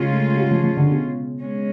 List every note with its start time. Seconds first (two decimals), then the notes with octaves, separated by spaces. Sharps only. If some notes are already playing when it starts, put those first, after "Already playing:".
Already playing: C#3 G#3 C#4 F4
0.11 A3
0.37 F#3
0.51 F3
0.64 F3
0.77 D3
0.90 B2
1.42 G#3 C#4